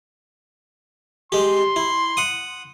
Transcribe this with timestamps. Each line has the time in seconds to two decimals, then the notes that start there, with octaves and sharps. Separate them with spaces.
1.32 G#3 G4 C6
1.76 E4
2.17 F#5 D#6